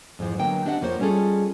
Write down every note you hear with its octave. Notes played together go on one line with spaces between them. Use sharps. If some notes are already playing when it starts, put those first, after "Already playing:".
F2 G#2 E3 F3
D3 F#3 G#3 A#3 B3 G5
C4 D4 G4 D#5 E5 F#5
F2 F3 A#3 C#4 C5 C#5
G3 G#3 C#4 F4 G#4 A4